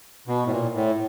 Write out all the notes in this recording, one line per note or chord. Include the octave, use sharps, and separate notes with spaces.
B2
A2
A#2
A2